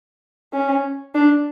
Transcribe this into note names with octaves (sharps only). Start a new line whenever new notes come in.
C#4
D4